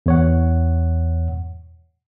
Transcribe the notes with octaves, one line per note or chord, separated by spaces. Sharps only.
E2 C#5 F#5